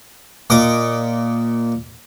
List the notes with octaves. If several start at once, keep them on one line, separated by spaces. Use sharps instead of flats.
A#2 D#5 D6